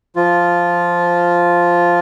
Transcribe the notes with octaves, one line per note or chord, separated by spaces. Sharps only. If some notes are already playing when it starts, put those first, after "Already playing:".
F3 F4